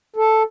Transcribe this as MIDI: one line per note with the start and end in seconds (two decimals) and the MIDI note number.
0.16 0.43 69